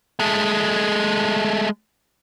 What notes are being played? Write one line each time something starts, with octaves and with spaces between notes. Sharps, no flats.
G#3 A3